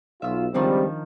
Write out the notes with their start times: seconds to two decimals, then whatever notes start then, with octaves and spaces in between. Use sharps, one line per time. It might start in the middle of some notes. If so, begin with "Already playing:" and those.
0.22 B1 B2 F4 E5 E6
0.54 C#2 D#3 F3 G3 C4 D4